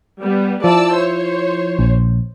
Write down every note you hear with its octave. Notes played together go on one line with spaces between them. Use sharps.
G3 B3
F3 E4 D5 A5 E6
C5 C#5
A#1